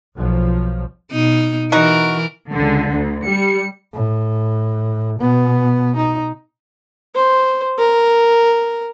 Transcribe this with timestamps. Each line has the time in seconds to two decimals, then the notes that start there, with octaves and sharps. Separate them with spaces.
0.16 B1 F3
1.12 B2 D#4
1.72 E3 D#4 F#4 A#4
2.52 C#2 D3
2.93 D2
3.25 G3 C#7
3.94 A2
5.19 B2 B3
5.97 D#4
7.15 C5
7.79 A#4